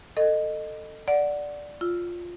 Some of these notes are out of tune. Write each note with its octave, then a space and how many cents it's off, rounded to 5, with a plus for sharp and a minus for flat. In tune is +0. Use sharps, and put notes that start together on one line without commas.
A4 +20 D#5 -20
D5 +0 F#5 +0
F4 +0 E6 +0